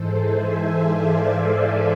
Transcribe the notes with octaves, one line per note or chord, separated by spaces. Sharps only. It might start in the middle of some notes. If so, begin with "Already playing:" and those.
Already playing: G#2 E3 G#3 A4 C5
E5 G#5
D5 F5
D5 F5